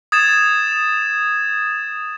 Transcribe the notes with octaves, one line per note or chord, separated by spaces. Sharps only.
D#6 G#6 A6 E7